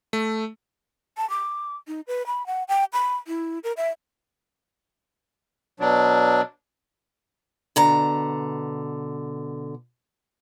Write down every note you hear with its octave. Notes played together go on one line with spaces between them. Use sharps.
A3
A5
D6
D#4
B4
B5
F#5
G5
B5
E4
A#4
E5
B2 F#3 D4
B2 D3 A#5